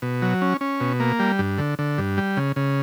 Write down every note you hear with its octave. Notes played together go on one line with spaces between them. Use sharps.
B2
F#3
C#4
C#4
B2
A#3
G3
G2
D3
D3
G2
G3
C#3
C#3